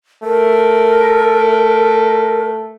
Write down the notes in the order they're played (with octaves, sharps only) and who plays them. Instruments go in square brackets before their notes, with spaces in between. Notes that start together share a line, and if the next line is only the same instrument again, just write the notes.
[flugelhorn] A3 [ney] A#4